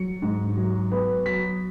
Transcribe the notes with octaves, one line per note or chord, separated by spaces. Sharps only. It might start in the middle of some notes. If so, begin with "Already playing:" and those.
Already playing: F#3 C#7
G#2
F#3
B3
F#3 B6